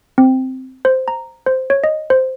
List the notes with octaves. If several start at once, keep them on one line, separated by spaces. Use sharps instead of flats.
C4
C5
A#5
C5
C#5
D#5
C5